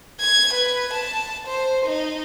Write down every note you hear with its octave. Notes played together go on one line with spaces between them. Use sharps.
G#6
B4
A5
C5
D#4